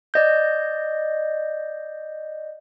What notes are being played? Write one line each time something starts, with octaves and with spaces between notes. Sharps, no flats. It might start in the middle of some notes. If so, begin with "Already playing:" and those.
D5 D#5 G6